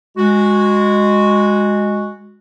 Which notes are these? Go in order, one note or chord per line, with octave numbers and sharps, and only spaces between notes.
G#3 F#4